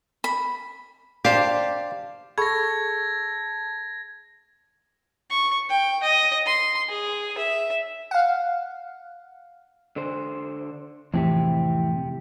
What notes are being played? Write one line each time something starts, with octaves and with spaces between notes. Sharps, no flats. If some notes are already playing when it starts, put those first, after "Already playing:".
B5
D4 G4 C5 F5
G#4 A4 B5 C#6 G#6 A#6
C#6
G5
D#5
C6
G#4
E5
F5 F#5
D3 C5
F2 A2 C3 E3 C4 G4